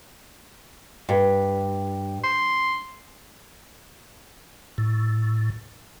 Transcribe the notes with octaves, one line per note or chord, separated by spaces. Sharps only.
G2
C6
A2